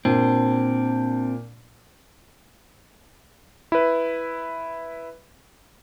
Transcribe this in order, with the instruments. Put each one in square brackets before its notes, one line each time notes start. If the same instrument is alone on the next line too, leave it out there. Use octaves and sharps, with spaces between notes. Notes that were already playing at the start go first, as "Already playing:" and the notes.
[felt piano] A#2 [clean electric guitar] C4 [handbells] D4
[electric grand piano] E4 B4